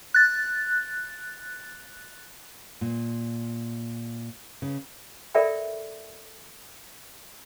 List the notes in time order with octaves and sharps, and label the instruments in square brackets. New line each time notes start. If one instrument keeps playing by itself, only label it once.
[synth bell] F#6 A6
[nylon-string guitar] A#2
C#3
[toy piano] A4 A#4 D5 E5 G5 B5